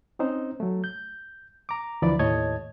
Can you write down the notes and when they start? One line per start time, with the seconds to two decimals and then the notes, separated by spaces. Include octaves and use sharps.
0.19 C4 C#4 D#4 C5
0.60 F#3 A3
0.84 G6
1.69 A#5 D6
2.02 D2 E3 F3 D5 B5
2.19 D#2 A2 C#5 D#5 A5 G#6